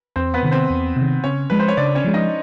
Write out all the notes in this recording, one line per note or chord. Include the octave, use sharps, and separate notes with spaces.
E2 C4 C5
B3 B4
C3 D#3
C4 C5
E2
C3 D#3
C#3 C#4 C#5
F3 G#3 B4
C5
C#5
C#3 D4 D5
C#4 C#5
F3 G#3
D#4 D#5